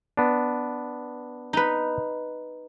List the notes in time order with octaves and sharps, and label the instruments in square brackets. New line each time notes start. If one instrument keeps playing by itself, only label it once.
[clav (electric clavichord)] B3 D4
[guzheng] D#4 B4